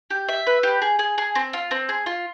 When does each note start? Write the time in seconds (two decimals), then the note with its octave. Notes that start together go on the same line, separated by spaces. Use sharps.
0.10 G4
0.29 E5
0.47 B4
0.63 G4
0.82 G#4
0.99 G#4
1.18 G#4
1.35 C4
1.53 F4
1.71 C4
1.89 G#4
2.06 F4